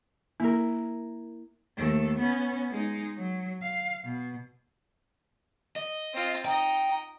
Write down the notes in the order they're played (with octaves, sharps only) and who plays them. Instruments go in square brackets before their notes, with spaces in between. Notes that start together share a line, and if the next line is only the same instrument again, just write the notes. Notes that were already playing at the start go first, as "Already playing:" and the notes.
[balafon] A#3 [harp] E4 A#4
[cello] D#2 A3
B3 C#4
G#3 D#4
F#3
F5
B2
[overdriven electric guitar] D#5
[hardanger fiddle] C4 F4
[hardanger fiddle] D#4 D#5 [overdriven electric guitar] G5